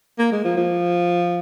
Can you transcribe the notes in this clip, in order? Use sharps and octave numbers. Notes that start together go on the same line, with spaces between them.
A#3
G#3
F3
F3